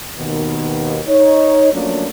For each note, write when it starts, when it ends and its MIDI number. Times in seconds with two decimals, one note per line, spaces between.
0.19 1.01 39
0.19 1.01 47
0.19 1.01 51
1.07 1.72 63
1.07 1.72 73
1.72 2.08 53
1.72 2.08 54
1.72 2.08 57
1.72 2.08 58
1.72 2.08 61
1.72 2.08 62